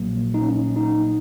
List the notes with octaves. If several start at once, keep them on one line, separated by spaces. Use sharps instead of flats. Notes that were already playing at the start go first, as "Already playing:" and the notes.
Already playing: A#1 A#2 F#3 A#3
D#4
C#4
D#4